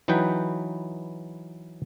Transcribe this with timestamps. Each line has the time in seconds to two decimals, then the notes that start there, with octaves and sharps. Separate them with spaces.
0.08 E3 F#3 D#4 B4 G5